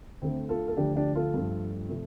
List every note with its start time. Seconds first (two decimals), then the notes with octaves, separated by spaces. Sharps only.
0.22 D2 D3 A3 C4
0.49 F4 A4
0.68 A4
0.77 D2 D3 F3 A3 D4 G4
0.96 D4 G4
1.15 F4 A4
1.34 G2 F3 A3
1.89 C3 F3 A3